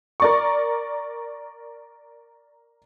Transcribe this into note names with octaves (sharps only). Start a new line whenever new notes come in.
A#4 D5 C#6